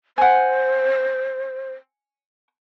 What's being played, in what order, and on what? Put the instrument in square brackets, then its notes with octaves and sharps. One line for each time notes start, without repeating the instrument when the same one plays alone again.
[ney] C5 [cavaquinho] F#5 G#5